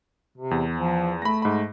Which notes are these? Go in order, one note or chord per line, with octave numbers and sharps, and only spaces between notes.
C3
E2
F3
A3 B5 A#6
G#2 B5